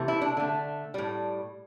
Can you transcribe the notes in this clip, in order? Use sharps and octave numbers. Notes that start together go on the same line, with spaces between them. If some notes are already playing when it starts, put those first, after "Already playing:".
Already playing: C3 E3 A3
E4
D4
D3 A3
A2 G3